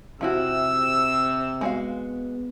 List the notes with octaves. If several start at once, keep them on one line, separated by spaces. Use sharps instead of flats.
C3 F3 E4 F#4 E6
G#3 B3 F#4 F5